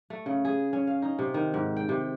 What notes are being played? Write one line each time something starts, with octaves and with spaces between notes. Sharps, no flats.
A3
C#3
G#4
C#4
F5
D#4
C3
D#3
G#2
G5
C3